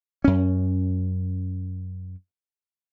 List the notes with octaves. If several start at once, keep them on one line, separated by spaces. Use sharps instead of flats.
F#2 C#4